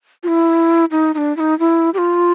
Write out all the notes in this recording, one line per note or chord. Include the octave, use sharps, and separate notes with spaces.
F4
E4
D#4
D#4
D4
E4
D#4
E4
G4
F4